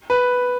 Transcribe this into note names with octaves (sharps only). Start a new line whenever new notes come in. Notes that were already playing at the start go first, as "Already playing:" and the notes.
B4